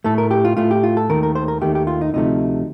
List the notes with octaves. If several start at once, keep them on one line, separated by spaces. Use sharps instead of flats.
A2 A3 A4
A#4
G4
F4
A2 A3 F4
G4
F4
A4
D#2 D#3 A3 A#4
A#4
C5
A#4
D#2 D#3 A3 G4
G4
F4
D#4
D2 C3 F3 A3 D#4